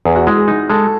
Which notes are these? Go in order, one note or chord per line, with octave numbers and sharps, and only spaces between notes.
E2 G#4
F#4
G#3 E4
G#4
D#4
G#3 A4